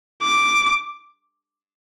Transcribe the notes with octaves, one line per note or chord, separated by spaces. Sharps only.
D6